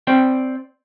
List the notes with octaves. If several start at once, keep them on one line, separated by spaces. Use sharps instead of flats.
C4 C5 D5 G5